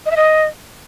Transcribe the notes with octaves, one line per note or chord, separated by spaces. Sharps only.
D#5
E5
D#5